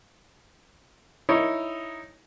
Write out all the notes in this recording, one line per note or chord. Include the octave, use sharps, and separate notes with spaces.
D#4 E4 C#5